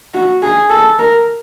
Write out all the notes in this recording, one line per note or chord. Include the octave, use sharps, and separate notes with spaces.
F#4
G#4
A4
A#4